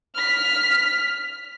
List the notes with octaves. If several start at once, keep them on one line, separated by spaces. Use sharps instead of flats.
F6 B6